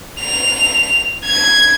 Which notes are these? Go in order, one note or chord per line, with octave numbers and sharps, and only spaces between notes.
F7
G#6